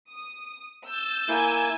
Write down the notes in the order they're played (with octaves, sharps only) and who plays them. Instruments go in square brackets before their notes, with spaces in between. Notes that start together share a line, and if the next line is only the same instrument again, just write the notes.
[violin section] D#6
E6 G6 A6
[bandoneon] A#3 E4 [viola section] G#5